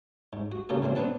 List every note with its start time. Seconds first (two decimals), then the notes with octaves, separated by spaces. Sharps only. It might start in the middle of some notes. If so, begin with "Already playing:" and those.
0.33 G#2
0.52 F#4
0.69 C#3 A#3 F#4 G4 A4
0.82 A#2 C#3 E3 C4
0.95 B3 C4 D4 B4 F#5 A5